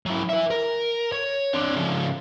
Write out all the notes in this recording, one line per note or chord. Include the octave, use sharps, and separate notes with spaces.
F#3 E4
B4 E5
A#4
C#5
C4 D4
C#3 F3